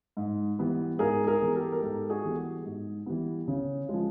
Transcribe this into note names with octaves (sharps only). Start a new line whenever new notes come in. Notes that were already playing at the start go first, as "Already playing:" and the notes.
G#2
E3 G3 B3
G#2 G#4 A#4
G#4 A#4
E3 G3 B3
G4 A4
A#4
G#2 G4 A4
F#4 G#4
E3 G3 B3
G#2
E3 G3 B3
C#3
F3 G#3